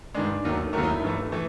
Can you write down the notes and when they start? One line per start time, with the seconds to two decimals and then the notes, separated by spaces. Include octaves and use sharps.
0.14 G2 D#3 G#3 D5
0.45 D#2 D#3 F#3 A3
0.73 D#2 D#3 F#3 A3 A#4
0.83 D#4
0.88 E4
1.02 G2 E3 A3
1.32 E3 A3